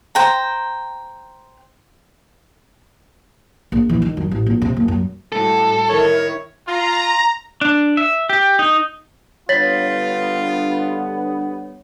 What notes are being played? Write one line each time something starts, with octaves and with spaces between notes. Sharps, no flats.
C5 G5 A#5
A#1
E3
D#3
F#2
A1
A#1
C3
F#1
F#2
A2 G3 F#4 A4
D#3 E4 A#4 C#5
F4 A#5
D4
E5
G4
D#4
G2 D3 B3 F4 C#5 A6 B6 F#7